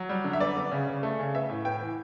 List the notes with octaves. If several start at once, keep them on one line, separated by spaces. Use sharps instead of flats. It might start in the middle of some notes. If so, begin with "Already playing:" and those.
Already playing: F#3
G3
D3
E5
B3 D5
B3
C#3
C#3
A3
C#3
B3 E5
A2
B3 G5
E3